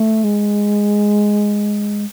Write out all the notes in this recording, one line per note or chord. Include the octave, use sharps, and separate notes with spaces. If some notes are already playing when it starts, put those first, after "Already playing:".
Already playing: A3
G#3